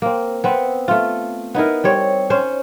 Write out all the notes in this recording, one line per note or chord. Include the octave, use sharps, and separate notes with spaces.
A#3 C4
B3 C4
A3 F4
B3 D#4 E4 A#4
G3 C4 C#5
C#4 C5